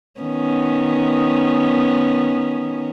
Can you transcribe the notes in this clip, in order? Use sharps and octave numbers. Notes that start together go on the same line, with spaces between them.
D#3 B3 C#4